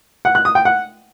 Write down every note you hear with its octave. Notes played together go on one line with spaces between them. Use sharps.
F#5
F#6
D#6
G5
F#5